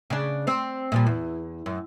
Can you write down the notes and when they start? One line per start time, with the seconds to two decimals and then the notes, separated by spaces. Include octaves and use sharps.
0.10 C#3 D4
0.47 C4 C5
0.92 A#2 F3 G3
1.07 E2
1.66 F#2